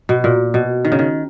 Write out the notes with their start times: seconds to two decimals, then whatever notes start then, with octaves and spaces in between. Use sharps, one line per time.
0.09 B2
0.24 A#2
0.54 B2
0.85 D#3
0.92 C#3
0.99 D#3